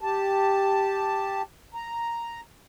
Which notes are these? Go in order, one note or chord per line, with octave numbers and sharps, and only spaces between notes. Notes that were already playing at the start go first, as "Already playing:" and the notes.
G4 A5
A#5